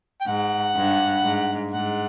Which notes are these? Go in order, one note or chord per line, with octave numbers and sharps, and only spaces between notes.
G5
G#2 F#5
G2
G#2
G#2 F#5